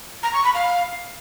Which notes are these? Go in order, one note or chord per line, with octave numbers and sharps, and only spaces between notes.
A#5
C#6
B5
F5